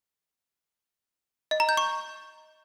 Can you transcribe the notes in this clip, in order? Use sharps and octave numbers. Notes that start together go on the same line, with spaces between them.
D#5
A#5
G6
C#6